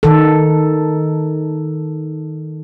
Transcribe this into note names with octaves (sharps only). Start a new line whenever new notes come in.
D#3 A4